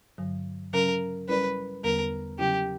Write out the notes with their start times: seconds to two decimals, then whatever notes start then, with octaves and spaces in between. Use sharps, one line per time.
0.18 G2 D3 F#3
0.73 C#3 F#3 C#4 A#4
1.29 G3 C#4 E4 A#4 B4 D5
1.83 E2 D3 G3 B3 A#4
2.38 C#3 F#3 C#4 E4 G4